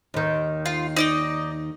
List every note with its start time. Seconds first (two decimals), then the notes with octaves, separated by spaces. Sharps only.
0.14 D#2 D#3
0.66 F4
0.97 D#4 D5 D#5